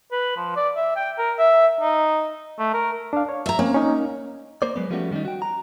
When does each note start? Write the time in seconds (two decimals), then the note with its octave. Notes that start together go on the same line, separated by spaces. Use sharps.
0.12 B4
0.37 F3
0.56 D5
0.76 E5
0.96 G5
1.18 A#4
1.39 E5
1.81 D#4
2.59 A3
2.74 A#4
3.13 D4 F5
3.29 C#5
3.46 E5 A#5
3.59 A#3 C4 C#4
3.74 C#4 D#4
4.62 A#3 C5 D5
4.76 F#3 G#3 B3
4.90 F3 G3 A3 B3 C#4 F#4
5.11 D#3 G3 A3 C#4 D#4
5.25 F#4 G5
5.42 A#5